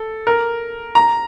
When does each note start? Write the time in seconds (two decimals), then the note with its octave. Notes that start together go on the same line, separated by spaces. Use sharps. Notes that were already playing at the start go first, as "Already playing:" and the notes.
Already playing: A4
0.27 A#4
0.95 A#5